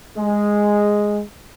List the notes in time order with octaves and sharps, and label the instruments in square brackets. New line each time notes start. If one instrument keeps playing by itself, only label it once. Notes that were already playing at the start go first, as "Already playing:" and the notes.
[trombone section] G#3